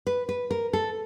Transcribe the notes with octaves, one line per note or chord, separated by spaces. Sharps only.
B4
B4
A#4
A4